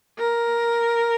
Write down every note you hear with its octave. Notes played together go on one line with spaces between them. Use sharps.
A#4